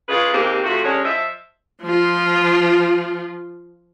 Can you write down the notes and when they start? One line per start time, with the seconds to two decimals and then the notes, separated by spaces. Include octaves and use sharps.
0.09 C#3 G#3 F4 G#4 B4
0.33 D#2 G#3 A#3 C4 G4
0.64 C3 F3 A3 F#4
0.84 D3 G3 G#3 C#4
1.04 F3 D#5 E5
1.82 F3 F4